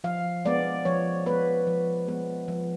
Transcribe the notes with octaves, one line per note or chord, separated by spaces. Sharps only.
F3 F5
G#3 B3 D5
F3 C#5
G#3 B3 B4
F3
G#3 B3
F3